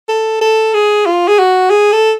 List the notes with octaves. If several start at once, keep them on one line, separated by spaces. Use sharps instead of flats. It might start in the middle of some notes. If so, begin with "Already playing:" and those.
A4
A4
G#4
F4
G#4
F#4
G#4
A4